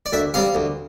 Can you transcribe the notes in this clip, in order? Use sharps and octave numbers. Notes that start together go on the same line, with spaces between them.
D5
D2 E5
C3 G3 F5
D2